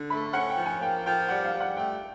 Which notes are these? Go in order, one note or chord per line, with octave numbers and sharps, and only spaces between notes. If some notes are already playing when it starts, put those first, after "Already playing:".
Already playing: D3
A3 B5
C#4 F#5
G5
F3
G#5
A#3 G5
F3 G5
G3 F#5
F5
G3
F#5
A3 G5